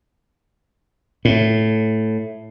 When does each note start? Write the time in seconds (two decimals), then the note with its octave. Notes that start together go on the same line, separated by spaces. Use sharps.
1.25 A2